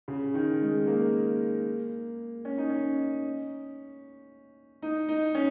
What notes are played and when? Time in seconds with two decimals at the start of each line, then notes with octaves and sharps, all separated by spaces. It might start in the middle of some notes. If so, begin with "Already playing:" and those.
0.08 C#3
0.34 D#3
0.61 G#3
0.87 A#3
2.45 C#4
2.58 D#4
2.70 C#4
4.82 D#4
5.09 D#4
5.35 C#4